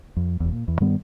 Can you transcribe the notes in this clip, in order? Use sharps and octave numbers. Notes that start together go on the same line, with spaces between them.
F2
E1 E2
A#2
E2
G2 D#3 G3 B3